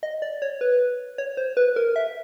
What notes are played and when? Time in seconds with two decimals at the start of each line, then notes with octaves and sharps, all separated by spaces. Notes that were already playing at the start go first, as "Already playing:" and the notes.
0.03 D#5
0.22 D5
0.42 C#5
0.61 B4
1.18 C#5
1.37 C5
1.57 B4
1.76 A#4
1.96 E5